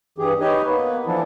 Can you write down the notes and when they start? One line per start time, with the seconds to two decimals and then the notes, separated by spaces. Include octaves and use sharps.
0.18 G2 E3 G4 G#4
0.40 D#4 G4 B4 C#5 D#5 G#5
0.66 A#3 B3 B4
1.06 E3 F3 D4 E4 A4